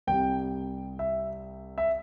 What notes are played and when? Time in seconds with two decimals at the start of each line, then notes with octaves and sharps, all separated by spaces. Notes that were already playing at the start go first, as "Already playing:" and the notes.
0.07 C2 C3 G3 G5
0.99 E5
1.78 E5